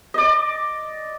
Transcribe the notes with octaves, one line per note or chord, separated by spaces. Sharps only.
D5 D#5